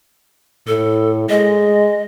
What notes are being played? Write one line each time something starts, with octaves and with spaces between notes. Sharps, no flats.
A2 A4
G#3 D#5